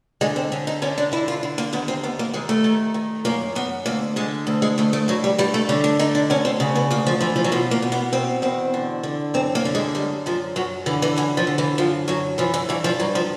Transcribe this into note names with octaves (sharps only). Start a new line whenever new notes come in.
D3 G#3
C4
D3 C#4
D#4
D3 C#4
D4
D3 E4
F4
D3
A#3
D#2 B3
C4
D#2 B3
A#3
D#2 G#3
A3
D#3
D#3
F#2 A#3
F#2 B3
D2 A#3
D3 G#3
D2
G#3
D2 A3
A3
G2 F#3
G3
G2 G3
A3
D3 C#4
D4
D3 D#4
D4
D2 C#4
C4
C#3
B3
D2 A#3
F3
E3 F3
F3
F#3
B2 F3
A#3
B2
B3
B2 C4
E2 C4
D3
D3
F#2 C4
A#3
D3
G#3
F#2 G3
F#2 F3
F#2 F#3
D3 E3
E3
F#2 E3
F3
D3
E3
F#2 F3
F#2 F#3
E3 F3
E3
G2 E3
F3
G2 F#3
F3